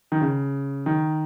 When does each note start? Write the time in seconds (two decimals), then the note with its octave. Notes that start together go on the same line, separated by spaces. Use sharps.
0.12 D#3
0.21 C#3
0.86 D#3